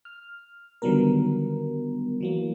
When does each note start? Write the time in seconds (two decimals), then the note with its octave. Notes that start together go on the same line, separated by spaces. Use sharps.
0.05 F6
0.82 D3 D#3 F#3 G3 B3 A#4
2.21 E3 F#3 A#3